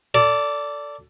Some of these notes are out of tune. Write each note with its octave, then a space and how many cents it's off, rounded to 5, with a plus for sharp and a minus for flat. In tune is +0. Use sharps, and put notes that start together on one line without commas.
A4 +20 D5 -15